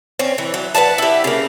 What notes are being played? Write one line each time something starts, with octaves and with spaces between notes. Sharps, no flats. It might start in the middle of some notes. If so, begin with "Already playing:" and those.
C4 C#4
E3
F#3
B4 D#5 F#5 A5
E4 G4
C#3 A#3